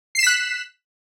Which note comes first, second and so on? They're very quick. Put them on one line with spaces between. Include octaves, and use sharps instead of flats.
C7 E7 B6 F#6